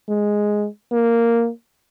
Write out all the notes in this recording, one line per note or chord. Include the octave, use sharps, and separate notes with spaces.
G#3
A#3